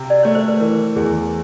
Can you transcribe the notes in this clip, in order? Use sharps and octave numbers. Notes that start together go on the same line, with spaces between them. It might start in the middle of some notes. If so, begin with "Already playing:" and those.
Already playing: C3
D5
A3 C#5
C5
B4
E3 A#4
E2 G#4